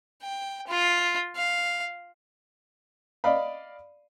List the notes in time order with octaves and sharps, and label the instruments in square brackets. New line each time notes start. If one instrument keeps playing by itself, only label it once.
[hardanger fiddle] G5
F4
F5
[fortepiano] D5 D#5 F5 B5